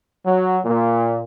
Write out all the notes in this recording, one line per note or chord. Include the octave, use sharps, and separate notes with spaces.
F#3
A#2